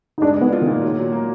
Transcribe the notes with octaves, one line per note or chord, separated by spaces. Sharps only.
D#4
G#3 D4
G#3 B3
F4
D#3
A#2
F#3
F#3
A#3